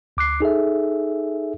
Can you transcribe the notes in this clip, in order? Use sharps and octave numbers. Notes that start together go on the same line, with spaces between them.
D2 D6 F#6 C7
D#4 G#4 A4 E5